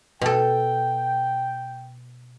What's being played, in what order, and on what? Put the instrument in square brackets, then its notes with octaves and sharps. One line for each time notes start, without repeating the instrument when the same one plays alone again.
[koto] B2 A4 [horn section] G5